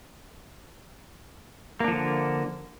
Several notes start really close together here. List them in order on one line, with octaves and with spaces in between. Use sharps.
A#3 D4 F3 D3